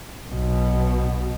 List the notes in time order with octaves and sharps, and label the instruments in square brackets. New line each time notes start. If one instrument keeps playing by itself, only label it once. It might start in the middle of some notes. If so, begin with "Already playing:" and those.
[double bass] B1 B2